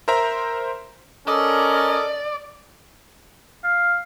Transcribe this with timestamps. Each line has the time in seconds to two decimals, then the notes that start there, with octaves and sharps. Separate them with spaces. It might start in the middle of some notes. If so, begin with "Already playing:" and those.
0.08 A#4 C5 E5 A#5
1.28 C#4 A4 A#4 D5 D#5
3.64 F5